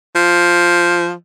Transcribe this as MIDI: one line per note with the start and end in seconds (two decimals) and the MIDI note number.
0.16 1.12 53